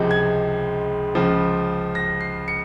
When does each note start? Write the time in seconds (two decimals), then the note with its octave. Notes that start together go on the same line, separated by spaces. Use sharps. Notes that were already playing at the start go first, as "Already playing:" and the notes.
Already playing: C#2 C3 F3 G#3
0.11 G#6
1.15 C#2 C#3 F3
1.95 A#6
2.21 C7
2.48 C#7